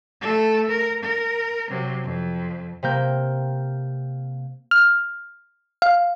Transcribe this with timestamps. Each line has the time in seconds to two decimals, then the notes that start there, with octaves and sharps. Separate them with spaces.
0.21 A3 A4
0.69 A#4
1.03 A#4
1.70 C3 F#3
2.03 F2
2.83 C3 A#3 G6
4.71 F6
5.82 F5